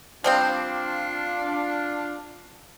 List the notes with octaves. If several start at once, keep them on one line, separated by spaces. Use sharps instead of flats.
F3 G3 C4 D4 F4